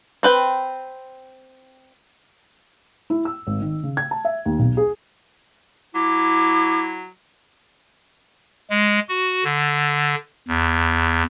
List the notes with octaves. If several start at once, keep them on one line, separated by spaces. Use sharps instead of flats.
C4 B4 G5
E4
E6
G#1
D#3
C#3
G#6
A5
E5
D#2
B1
G#4
F#3 E4 D6
G#3
F#4
D3
E2